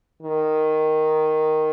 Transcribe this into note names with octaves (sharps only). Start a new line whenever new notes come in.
D#3